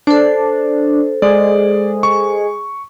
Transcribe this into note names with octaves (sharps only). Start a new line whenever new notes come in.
D4 A4 C5
G#3 G#4 D5
C#6